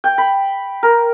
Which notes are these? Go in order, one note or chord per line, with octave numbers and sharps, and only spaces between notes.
G5
B5
A#4